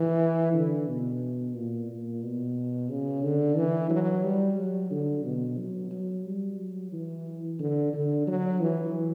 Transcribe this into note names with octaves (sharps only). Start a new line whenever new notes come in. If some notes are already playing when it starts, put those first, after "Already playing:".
Already playing: E3
D3
B2
A#2
A#2
B2
C#3
D3
E3
F#3
G3
F#3
D3
B2
F#3
F#3
G3
F#3
E3
D3
D3
F#3
E3